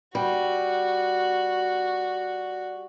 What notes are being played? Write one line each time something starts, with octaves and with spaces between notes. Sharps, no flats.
G3 F#4